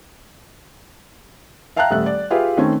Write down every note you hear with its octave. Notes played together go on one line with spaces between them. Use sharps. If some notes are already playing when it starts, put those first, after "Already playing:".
E5 F5 G5 A5 A#5 F#6
D#1 A3 A4 E5 F#6
D5
F4 G4 G#4 B4 E5 F5
D#3 A3 C4 C#4